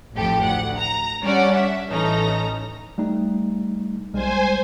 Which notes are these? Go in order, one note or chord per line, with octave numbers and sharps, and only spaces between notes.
A1 F2 A2 F3 G4 A4
D2 F#5
A#5
G3 C#4 D4 D5 F#5
E5
A1 E3 C#4 D#4 A4 A#5
G3 A3 D#4
B1 G3 G#3 C5 G#5